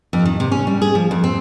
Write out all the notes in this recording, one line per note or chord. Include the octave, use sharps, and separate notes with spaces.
F2
D#3
C3
C#4
G3
G#4
F3
F2
C4